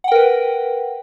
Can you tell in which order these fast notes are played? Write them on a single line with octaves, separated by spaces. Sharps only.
F#5 G5 A#4 B4